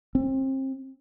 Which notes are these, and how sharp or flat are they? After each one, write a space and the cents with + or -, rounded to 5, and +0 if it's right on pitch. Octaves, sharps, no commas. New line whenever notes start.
C4 +30